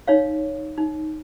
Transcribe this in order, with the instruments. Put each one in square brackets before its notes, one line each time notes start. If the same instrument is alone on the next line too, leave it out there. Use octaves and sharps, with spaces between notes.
[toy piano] D#4 C#5 F5
D#4